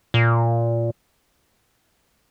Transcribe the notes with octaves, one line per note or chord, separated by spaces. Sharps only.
A#2